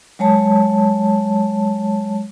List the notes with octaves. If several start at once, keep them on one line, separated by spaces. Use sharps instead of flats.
F#3 G#3 C#5 A5